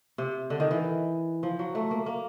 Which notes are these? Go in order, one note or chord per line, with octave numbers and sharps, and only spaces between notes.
C3
D3
D#3
E3
F3
F#3
A3
A#3
A#3